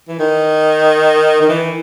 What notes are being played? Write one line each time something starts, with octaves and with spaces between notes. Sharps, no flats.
E3
D#3
D#3
E3